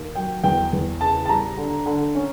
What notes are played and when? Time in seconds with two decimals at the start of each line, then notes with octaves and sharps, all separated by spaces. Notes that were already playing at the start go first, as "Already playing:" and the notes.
Already playing: D#2
0.15 F#3 G5
0.44 E2 G5
0.73 E2
1.01 C#3 A5
1.25 A5
1.29 G3 A#5
1.58 D3
1.86 D3
2.15 C#4